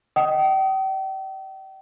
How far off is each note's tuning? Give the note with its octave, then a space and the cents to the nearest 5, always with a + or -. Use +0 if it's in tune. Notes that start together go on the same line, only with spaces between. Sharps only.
D#5 +0 G5 -40 D#6 +10